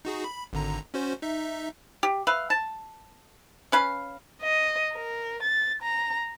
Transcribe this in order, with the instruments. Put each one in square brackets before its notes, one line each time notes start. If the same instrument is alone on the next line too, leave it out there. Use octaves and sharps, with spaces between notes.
[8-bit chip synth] D#4 F#4 G#4
B5
G#1 D3 A#5
C#4 F#4 C5
D#4 E5
[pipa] G4
B4 E5 F5
A5
C#4 B4 F5
[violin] D#5
A#4
A6
A#5